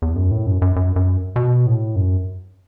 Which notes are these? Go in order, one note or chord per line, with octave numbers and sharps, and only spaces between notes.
E2
F#2
A2
F#2
F#2
F#2
F#2
B2
A2
F#2